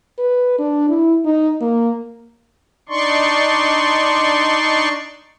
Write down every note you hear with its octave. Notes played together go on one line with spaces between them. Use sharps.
B4
D4
E4
D#4
A#3
D4 D#4 D5 C6 C#6